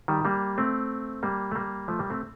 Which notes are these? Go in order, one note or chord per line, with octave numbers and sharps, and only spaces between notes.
D#3 G3
G3 A#3
A3 C4
G3 A#3
A3
G3 A#3
F3 A3
G3 A#3
A3 C4